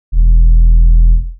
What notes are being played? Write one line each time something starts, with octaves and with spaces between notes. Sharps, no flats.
E1